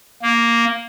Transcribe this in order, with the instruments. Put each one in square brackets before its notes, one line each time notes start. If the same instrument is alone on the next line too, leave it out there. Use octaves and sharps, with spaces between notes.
[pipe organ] A#3